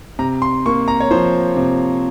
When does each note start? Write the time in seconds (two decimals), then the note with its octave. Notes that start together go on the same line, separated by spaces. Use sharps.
0.19 C3 A#5
0.42 C6
0.66 A#3 C#6
0.88 A#5
1.00 C#5
1.11 F3 C5
1.57 C3